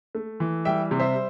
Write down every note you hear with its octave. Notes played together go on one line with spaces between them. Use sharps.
A3
E3
G3 E5 G5
C3
C5 E5